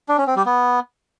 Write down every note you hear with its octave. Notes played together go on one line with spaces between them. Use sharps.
D4
C#4
C4
G3
B3